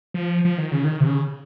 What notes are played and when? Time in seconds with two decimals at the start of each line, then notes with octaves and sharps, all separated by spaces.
0.14 F3
0.45 F3
0.58 D#3
0.72 C#3
0.85 D#3
1.00 C3
1.07 C#3